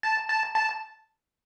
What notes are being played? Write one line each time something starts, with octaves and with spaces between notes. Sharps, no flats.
A5
A5
A5